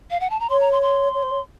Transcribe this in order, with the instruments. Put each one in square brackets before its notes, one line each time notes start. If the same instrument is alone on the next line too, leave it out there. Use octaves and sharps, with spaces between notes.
[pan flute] F5
F#5
A5
A#5
[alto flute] C#5 [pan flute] C6
[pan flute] A#5
C6
C6
[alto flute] C#5
C5
C#5